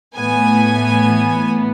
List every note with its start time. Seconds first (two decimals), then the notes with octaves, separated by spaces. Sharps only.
0.15 A2 E3 B3 G#5